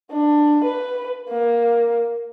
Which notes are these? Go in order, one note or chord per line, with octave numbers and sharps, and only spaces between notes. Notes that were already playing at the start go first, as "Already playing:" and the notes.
D4
B4
A#3